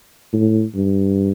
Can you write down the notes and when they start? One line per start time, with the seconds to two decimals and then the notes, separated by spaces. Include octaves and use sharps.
0.33 A2
0.75 G2